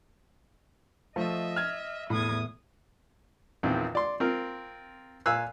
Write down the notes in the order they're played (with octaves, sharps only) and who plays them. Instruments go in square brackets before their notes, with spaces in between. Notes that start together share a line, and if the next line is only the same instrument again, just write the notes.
[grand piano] F3 A3 [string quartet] D#5 E5
[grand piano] F6 G#6
[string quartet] E2 D#6 G#6 [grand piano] A2
[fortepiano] A#1 E2 D#3 C4
D5 C6
C4 F4 A#4
A#2 F5 G#5 E6 F#6